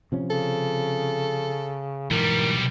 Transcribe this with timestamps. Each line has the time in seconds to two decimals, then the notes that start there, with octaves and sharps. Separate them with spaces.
0.12 C3 F3 C#4
0.31 C#3 A4
2.11 B1 G#2 E3 G3 A#4